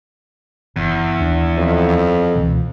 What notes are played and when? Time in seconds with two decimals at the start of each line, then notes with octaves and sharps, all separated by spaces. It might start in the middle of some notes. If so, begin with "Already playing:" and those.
0.76 F#1 E2
1.20 D#2 D4
1.57 F2
2.36 C#2 B2 E3